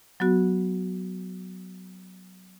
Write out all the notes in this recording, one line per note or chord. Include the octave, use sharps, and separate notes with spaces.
F#3 B3 F#4